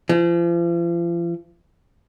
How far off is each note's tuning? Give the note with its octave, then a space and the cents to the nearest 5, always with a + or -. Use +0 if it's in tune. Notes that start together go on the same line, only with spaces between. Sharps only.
F3 -40